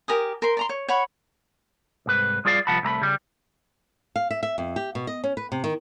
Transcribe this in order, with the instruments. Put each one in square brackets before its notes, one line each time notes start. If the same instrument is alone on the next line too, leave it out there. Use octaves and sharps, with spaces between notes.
[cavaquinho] G4 A#4 G#5 D#6
A#4 C5 C6
D5 A#5 C6
C#5
C#5 F#5 B5 C#6
[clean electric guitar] C2 G#2 B4
G3 F4 G#4 D5 F5
C2 F3 F#5 A5 B5
C2 A3 A#5 B5
C#3 G3
[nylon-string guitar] F5
E5
E5
F2
G4
B2
D#5
C#4
B4
C3
D#3